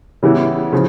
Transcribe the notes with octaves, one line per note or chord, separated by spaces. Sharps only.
C#3 E3 G3 B3 E4
C#3 F3